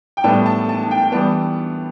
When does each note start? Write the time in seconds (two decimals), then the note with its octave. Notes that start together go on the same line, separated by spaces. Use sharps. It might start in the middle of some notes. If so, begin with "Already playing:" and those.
0.17 G5
0.24 A2 G3 B3 A5
0.46 A5
0.69 A5
0.83 A5
0.91 G5
1.12 E3 G3 B3 A5